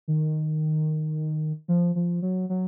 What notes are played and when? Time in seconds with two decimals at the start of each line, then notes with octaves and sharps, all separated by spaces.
0.08 D#3
1.68 F3
1.96 F3
2.22 F#3
2.50 F#3